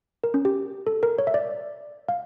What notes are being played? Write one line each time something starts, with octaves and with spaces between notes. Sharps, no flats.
A#4
C#4
G4
A4
A#4
C#5
E5
D5
F5